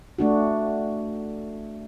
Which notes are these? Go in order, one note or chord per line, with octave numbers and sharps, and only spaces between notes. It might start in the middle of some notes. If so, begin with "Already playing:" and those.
A3 D4 F#4